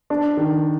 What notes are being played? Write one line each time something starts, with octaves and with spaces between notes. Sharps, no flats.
D4
D#3